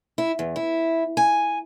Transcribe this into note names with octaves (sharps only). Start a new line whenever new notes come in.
E4
E2
E4
G#5